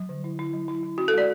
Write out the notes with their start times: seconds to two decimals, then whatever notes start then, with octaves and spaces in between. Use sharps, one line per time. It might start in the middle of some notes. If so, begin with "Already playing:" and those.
Already playing: F#3
0.09 D3
0.24 E4
0.39 E4
0.53 F#3
0.68 E4
0.83 E4
0.98 C#4 F#4
1.08 A4
1.13 G#3 D5